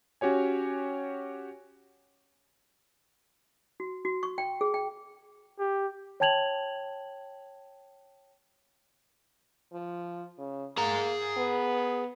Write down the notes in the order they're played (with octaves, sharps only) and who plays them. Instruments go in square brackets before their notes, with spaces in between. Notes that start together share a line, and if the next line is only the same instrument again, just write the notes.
[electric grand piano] C#4 F#4 G4 C#5 G#5
[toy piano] F#4
F#4
C#6
G5
G#4
G5
[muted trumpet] G4
[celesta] C#5 G5 A5 G#6 F7 F#7
[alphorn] F3
C#3
[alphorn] A#3 [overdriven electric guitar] G#4 A#5
[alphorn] B3